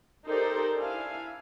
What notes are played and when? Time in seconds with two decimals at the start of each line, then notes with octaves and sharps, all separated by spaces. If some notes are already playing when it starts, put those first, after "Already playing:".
0.25 D#4 G4 A4 A#4 C5 D5
0.75 D4 E4 F5 G#5